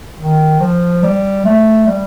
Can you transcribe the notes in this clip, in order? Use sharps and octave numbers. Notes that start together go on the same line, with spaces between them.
D#3
F3
G3
A3
G3